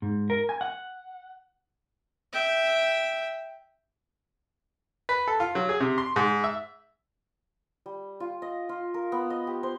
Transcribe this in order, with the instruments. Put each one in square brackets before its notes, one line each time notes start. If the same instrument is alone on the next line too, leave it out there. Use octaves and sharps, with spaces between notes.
[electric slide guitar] G#2
A#4
G#5
F#5
[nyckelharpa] E5 G5
[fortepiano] B4
A4
F4
F#3
G#4
C3
C6
G#2
E5
[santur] G3
F4
D#5
F4
A#4
B3
D#5
G4
C5